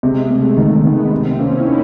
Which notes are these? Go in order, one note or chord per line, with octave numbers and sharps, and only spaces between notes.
C3 G#3
C3 A3
D#3
D#3 B3
C3 C4
A#3 C#4
E4
A#3 D#4